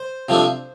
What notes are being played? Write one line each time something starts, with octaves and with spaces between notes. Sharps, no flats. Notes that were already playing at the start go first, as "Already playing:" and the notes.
Already playing: C5
C3 F3 A3 D4